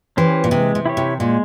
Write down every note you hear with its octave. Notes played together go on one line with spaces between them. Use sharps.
E3 C#4 G4 C5
A#2
C3 G#3
C3
E4 G4 C#5
C3
A#2 G#3